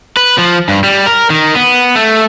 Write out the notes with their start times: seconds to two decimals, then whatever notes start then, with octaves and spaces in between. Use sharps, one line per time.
0.17 B4
0.38 F3
0.69 G2
0.84 G3
1.06 A#4
1.30 D#3
1.55 B3
1.96 A3